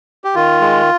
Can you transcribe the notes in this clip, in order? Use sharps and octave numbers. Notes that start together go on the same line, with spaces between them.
G4
D#3 F4
G#3